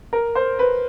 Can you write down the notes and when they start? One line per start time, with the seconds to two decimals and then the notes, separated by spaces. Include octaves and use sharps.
0.13 A#4
0.35 C5
0.59 B4